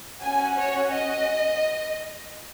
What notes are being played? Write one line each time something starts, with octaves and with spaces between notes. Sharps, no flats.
C#4 F#4 G#5
C#5
D#5